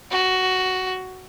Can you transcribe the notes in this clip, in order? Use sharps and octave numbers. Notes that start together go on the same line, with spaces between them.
F#4